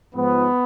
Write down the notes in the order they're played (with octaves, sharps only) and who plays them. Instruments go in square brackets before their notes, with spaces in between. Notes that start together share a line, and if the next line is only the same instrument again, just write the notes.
[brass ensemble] G#2 F3 G#3 B3